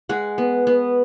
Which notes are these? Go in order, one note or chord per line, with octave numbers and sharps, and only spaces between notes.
G#3 F#5
B3
B3